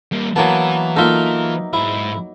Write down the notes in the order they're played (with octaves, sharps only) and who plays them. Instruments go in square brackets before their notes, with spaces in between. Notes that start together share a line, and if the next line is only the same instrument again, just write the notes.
[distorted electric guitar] G3 A#3
[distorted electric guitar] E3 [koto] F#3 A#3 B3 [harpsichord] A5
[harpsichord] A#3 F4 A4 [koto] D#4 E5
[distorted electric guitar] G#2 [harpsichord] E4